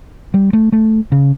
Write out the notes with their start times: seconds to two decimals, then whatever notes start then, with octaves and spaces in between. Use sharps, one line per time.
0.34 G3
0.53 A3
0.72 A3
1.12 C#3